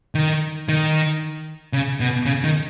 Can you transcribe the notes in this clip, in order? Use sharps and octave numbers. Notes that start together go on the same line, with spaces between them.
D#3
D#3
C#3
B2
C#3
D#3